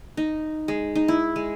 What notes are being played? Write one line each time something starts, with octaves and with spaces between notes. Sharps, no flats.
D#4
G#3
D#4
E4
G#3